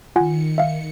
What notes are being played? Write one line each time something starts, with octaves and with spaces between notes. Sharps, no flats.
D#3 F4 F#5 G#5 C#7
E5 F5